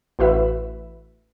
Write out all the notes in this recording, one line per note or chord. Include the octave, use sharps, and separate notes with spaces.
A1 F#4 B4 E5